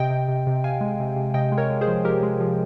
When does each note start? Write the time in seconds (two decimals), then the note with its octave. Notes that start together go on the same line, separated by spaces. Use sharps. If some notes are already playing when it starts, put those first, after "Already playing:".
Already playing: C3 D#5 G5
0.10 C3
0.28 C3
0.47 C3
0.64 C3 F5 G#5
0.81 G#3
1.00 C3
1.16 C3
1.34 C3 D#5 G5
1.52 G#3
1.58 A#4 C#5
1.70 G#3
1.81 G#4 C5
1.87 F3
2.05 F3 G4 A#4
2.23 G#3
2.40 F3